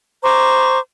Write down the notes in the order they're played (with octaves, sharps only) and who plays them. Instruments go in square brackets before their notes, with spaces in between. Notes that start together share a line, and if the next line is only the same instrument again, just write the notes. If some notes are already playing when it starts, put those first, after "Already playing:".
[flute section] C5 A#5 C#6 D6